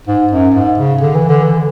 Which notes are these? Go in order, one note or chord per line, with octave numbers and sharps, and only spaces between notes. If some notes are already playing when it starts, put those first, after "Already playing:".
G#2
F#2
G#2
C#3
D3
E3
D3
E3